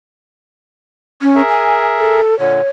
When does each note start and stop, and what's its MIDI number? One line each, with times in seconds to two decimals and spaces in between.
1.22 1.42 61
1.35 2.21 68
1.35 2.21 70
1.35 2.21 76
1.50 1.83 80
1.99 2.38 69
2.39 2.61 46
2.39 2.61 50
2.39 2.69 73